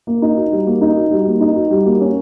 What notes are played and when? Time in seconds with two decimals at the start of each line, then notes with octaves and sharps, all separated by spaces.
0.07 A#3
0.22 D#4
0.37 F#4
0.52 G3
0.67 A#3
0.81 D#4
0.96 F#4
1.11 G3
1.26 A#3
1.41 D#4
1.56 F#4
1.71 G3
1.86 A#3
2.00 C#4